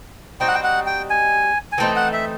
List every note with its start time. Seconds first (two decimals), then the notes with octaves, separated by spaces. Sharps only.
0.40 G3 C4 D#4 F#4 G5
0.48 F#5
0.55 G5
0.64 F#5
0.86 G5
1.10 G#5
1.72 G#5
1.78 E3 A3 C4 D#4 G5
1.96 F#5
2.13 E5